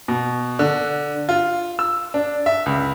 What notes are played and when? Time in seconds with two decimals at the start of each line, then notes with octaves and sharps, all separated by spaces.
0.08 B2
0.59 D3
1.29 F4
1.79 E6
2.14 D4
2.46 E5
2.66 C#2